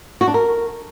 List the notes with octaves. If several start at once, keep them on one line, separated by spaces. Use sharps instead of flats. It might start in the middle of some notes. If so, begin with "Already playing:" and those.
F#4
D4
A#4